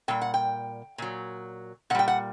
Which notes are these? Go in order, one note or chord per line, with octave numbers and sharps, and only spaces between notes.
A#2 G3 G5
F#5
G5
A#2 F#3
A#2 G3 F#5 G5
F#5